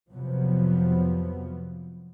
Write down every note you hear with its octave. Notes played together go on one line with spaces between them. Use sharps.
F2 C3 F3 F#3 B3